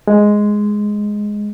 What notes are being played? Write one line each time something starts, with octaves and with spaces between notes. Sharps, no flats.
G#3